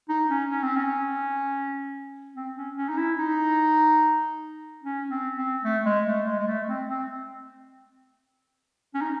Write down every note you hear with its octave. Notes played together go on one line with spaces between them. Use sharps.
D#4
C#4
C#4
C4
C#4
C4
C#4
C#4
D#4
E4
D#4
C#4
C4
C4
A3
G#3
A3
G#3
G#3
A3
C4
C4
C#4
D#4